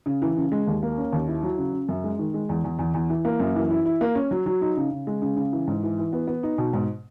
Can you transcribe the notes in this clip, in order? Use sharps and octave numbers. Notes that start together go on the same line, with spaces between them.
C#3
E3
C#3
G#3
D#2
A#3
C#4
D#2
E4
F#3
C#3
C#3
F#2
G#3
D#3
G#3
E2
E2
E2
E2
E3
A#3
F#2
E3
E4
E4
A#3
C#4
F#3
F#3
D#4
C#3
C#3
G#3
C#3
C#3
E3
G#2
E3
E3
B3
B3
D#4
B2
G#2